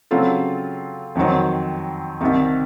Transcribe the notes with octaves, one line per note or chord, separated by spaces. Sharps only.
C#3 F#3 C4 F4 A4
F2 D#3 F#3 C4
C2 C3 D#3